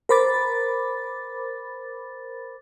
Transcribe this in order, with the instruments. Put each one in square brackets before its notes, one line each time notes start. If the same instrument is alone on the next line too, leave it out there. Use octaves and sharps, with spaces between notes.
[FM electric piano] A#4 C5 B5 D6 A6